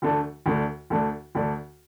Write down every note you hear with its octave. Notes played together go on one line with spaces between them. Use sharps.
D2 D3 A3 D4
D2 D3 A3 D4
D2 D3 A3 D4
D2 D3 A3 D4